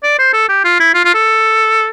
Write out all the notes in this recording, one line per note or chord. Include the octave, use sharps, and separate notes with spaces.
D5
C5
A4
G4
F4
E4
F4
F4
A4